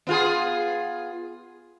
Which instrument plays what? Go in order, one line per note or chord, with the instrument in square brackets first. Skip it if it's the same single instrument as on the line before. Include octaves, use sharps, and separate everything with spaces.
[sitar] B3 F4 G#4